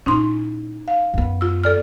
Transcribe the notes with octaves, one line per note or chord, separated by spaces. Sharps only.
A#2 C#4 D#4 E4 C6
F5
F#2 B3
F4 E6
A4 D5 F6